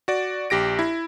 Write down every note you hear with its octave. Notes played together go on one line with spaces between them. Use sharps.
F#4 D5
A#1 G4 A#6 D7
E4